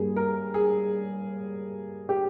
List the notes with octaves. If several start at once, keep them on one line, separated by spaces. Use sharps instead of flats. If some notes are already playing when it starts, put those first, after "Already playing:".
Already playing: G2 G3 A#3 G#4
A#4
G#4
G4